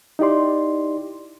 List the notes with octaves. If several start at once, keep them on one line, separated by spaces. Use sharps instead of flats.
D#4 E4 G4 D5 C6